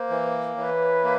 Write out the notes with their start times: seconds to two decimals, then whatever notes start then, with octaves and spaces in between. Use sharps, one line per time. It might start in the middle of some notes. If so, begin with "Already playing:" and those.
Already playing: A#3 C5
0.10 E3
0.56 E3 B4 C#5
1.04 A#3